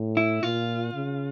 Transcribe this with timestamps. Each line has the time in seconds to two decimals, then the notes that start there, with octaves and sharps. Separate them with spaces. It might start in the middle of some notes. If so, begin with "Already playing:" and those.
Already playing: A2
0.17 E4
0.43 A#2 F4
0.94 C#3